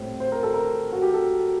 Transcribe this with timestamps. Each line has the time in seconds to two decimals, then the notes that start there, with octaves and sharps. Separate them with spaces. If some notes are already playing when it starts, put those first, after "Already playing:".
Already playing: A2 G3 C4
0.20 C5
0.32 A#4
0.43 A4
0.54 A#4
0.92 F#4
1.02 G4
1.14 A4